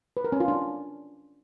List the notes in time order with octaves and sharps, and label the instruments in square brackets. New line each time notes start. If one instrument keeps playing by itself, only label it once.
[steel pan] B4
A#4
C#4
F4
D4